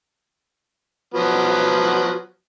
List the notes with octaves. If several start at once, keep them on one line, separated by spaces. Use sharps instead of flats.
F3 F#3 B3